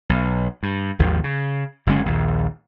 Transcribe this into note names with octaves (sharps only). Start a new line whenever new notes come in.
B1
G2
G#1 D#2 D#3 F3
C#3
F#1 D3 G#3 C#4
A#1 D#2